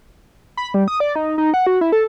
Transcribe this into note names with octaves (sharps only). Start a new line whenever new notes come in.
B5
G3
D#6
D5
D#4
D#4
F#5
F#4
E4
A4